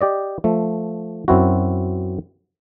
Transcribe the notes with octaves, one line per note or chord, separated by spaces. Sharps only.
G4 D5 D#5
F3 A3
F#2 C4 E4 F#4